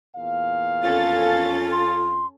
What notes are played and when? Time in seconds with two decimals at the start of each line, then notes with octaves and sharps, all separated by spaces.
0.16 E2 A#2 F5
0.84 F2 C#4 F4 A4 A6
1.72 C6